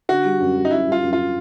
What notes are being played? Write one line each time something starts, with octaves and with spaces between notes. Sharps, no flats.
D3 F#4
G3
F#2
G3
D#4
F#2 E4
G3
F4
F#2
F4